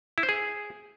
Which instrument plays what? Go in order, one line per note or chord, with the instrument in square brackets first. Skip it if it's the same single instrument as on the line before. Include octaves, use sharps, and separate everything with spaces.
[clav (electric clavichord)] E4
C5
G#4